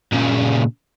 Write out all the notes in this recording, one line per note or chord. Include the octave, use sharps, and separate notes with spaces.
A#2 C#3